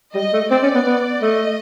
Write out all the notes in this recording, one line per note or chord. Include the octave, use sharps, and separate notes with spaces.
G3 D#5
A3
C4 D5
C#4
B3
B3
A3 D#5